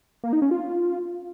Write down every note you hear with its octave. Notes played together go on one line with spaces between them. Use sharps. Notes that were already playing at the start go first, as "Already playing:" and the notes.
A#3
D#4
C#4
F4